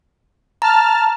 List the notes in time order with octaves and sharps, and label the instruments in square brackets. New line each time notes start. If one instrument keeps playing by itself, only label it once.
[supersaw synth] A5 F6 [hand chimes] A#5